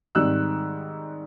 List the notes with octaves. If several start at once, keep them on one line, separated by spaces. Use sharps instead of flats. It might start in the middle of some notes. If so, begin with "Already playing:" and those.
G#2 D#3 G3 C4 E6 F#6